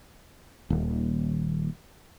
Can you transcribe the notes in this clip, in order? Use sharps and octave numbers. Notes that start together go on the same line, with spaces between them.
D#1 D#2